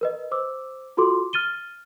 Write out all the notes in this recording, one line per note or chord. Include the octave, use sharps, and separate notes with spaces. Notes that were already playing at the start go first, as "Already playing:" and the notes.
A#4 B4 D#5
C5 D6 E6
F4 F#4 A4 C6 D6
F6 A6 D#7 G7